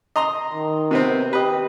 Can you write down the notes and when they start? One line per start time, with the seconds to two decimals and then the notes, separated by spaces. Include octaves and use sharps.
0.16 D#5 A#5 C6
0.54 D#3
0.91 C3 B3 C4
1.33 G4 B4 D#5